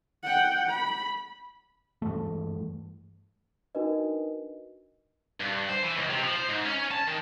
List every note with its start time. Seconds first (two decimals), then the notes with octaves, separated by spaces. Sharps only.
0.23 F#5 G5
0.70 B5
2.02 G2 E3 G#3 A3
3.75 D4 D#4 F#4 A#4 B4 D#5
5.41 G2
5.69 C5
5.83 E3
5.97 C#2
6.10 C3
6.23 F3
6.36 C5
6.49 G#2
6.65 C#4
6.91 A5
7.07 D#3